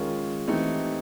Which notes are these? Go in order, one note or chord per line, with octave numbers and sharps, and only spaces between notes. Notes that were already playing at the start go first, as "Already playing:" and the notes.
Already playing: D#3 G#3 C#4 F4 A#4
E3 A3 C4 D#4 G4